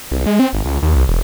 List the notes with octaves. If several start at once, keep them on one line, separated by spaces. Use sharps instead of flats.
C2
G#3
C4
G#1
C#2
D#2
C2
E1